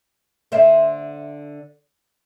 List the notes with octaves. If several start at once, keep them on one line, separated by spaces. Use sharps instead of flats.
D3 C5 E5